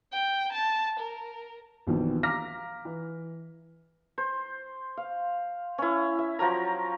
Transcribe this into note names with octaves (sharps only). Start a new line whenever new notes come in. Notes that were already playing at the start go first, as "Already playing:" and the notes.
G5
A5
A#4
A#1 B2 D#3 E3
F5 A#5 D6 F6 A#6 B6
E3
C5
F5
C#4 E4
E5
F3 F#3 A#4 A#5